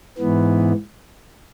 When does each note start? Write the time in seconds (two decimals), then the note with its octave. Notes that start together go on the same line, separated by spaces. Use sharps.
0.18 G#2 E3 B3